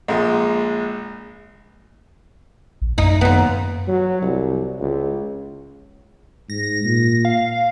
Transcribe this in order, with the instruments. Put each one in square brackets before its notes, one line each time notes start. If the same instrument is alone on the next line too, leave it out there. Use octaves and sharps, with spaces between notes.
[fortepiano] A#1 G#3
[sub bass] A#1
[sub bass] F#2 [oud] D#4
[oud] D#2 B3
[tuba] F#3
C2
C#2
[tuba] G#2 [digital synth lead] A#6
[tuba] A#2
[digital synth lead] F5